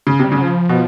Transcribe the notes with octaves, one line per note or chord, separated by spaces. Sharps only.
C#3
C3 G3
C#3
F#3
F3
B2